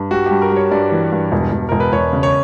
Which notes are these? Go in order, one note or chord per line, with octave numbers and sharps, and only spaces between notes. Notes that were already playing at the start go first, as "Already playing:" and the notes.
Already playing: G2
G3 F#4
G2 G4
A#4
G3 C#5
G2 D5
E3
G2
E1
E1
E1 A#4
B4
E1 C#5
C#3
C#5